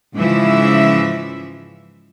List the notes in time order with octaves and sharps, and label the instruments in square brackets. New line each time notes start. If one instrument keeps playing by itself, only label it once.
[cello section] G#2 C#3 E3 F3 E5